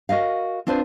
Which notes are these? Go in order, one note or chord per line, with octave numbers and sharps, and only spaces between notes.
F#4 A#4 D#5 F5
C4 D4 F4 B4 C5